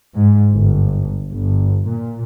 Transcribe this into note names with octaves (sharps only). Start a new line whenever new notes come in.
G#2
G1
G1
A#2